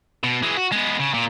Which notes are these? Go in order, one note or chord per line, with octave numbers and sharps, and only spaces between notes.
B2
E3 G#3
F#4
G#3 B3
C#3
A#2